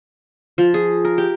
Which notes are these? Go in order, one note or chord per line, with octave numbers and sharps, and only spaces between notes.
F3
G#4
A#4
G4